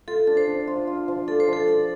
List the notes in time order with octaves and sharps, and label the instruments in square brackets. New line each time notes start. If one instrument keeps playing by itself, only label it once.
[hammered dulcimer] F4 [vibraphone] A4
[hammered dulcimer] D4 [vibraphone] A4
[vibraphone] C5
[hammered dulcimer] D4
F4
F4
F3
[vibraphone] A4 [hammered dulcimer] D5
[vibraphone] C5
[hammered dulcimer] F3
[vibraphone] A4
[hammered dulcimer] D5